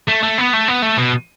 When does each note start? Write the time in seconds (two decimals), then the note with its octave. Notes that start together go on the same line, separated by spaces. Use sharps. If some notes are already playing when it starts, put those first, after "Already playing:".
0.08 A3
0.23 A3
0.38 B3
0.54 A3
0.68 B3
0.82 A3
0.98 B2